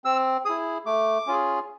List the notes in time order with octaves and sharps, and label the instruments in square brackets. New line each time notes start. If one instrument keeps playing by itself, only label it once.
[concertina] C4 E6
E4 G#4 D#6
A3 D6
C#4 F4 G#4